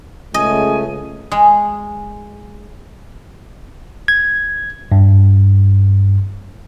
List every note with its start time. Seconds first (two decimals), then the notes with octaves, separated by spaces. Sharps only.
0.34 C#2 C#3 A3 D#5 G#5
1.31 G#3
4.08 G#6
4.92 G2